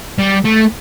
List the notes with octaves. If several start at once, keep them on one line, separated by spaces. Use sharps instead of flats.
G3
A3